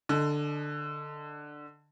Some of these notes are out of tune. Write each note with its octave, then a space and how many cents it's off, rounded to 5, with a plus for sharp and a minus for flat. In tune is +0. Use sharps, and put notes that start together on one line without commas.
D3 +10 D#5 +0 A5 -40